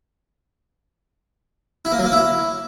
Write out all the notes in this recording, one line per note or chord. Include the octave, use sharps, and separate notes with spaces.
E4
A#3
F#3
A#3
E4